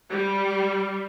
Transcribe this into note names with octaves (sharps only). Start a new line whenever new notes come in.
G3